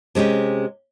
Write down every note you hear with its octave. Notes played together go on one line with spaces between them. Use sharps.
C3 G#3 C#4 G4